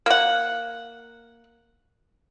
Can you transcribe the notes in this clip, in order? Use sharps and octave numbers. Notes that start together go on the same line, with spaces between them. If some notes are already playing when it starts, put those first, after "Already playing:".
A#3 F#5